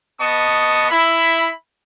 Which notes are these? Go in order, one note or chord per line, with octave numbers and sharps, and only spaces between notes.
B3 D#5 A5 C#6 D#6
E4 B5